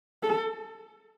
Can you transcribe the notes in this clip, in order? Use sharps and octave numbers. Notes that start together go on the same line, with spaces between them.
A4